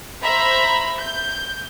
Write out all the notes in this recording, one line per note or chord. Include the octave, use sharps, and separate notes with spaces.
C5 E5 A#5 B5
G6